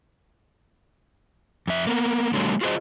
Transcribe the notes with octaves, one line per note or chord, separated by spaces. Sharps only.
F2 E5
A#3 B3
D3 F#3 G#3 A#3
F4 F#4 G#4 A4 C5 D#5